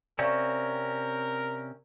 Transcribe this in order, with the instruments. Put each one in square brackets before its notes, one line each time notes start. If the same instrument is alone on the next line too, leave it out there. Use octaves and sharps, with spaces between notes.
[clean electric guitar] C3 C4 C#4 [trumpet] A#4 [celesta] D5 F5 C#6